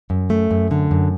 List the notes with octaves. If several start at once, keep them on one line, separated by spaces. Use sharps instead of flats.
F#2
A3
F#2
D3
F#2